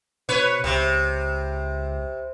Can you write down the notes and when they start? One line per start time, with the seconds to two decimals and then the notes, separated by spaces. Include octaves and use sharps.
0.29 B2 B4 C#5
0.64 C#2 C3